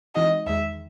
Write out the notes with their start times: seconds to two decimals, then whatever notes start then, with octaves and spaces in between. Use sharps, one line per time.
0.15 C3 E3 G#3 D#4 F#4 D#5
0.46 E2 D#3 G#3 E5